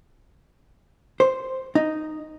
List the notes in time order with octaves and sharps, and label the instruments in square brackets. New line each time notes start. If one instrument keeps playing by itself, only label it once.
[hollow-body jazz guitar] C5
D#4